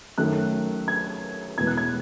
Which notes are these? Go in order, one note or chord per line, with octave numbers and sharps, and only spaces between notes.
F#2 D#3 A3 F#6
G#6
E2 B2 G#3 G#6
F#6
G#6